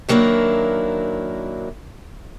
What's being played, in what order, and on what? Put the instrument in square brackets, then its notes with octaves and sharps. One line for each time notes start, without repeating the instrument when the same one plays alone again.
[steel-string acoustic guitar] D#3 F#3 A#3 D4 E4